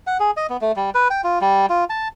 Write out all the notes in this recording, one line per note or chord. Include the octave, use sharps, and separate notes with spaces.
F#5
G#4
D#5
B3
A3
G3
B4
G5
F4
G3
F4
A5